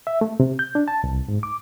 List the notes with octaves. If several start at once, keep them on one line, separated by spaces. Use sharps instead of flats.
E5
A3
C3
G6
D4
A5
C2
G#2
D6